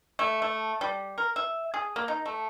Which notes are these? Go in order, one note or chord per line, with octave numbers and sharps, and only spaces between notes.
A3
A3
G3
A#4
E5
G#4
A#3
D#4
A3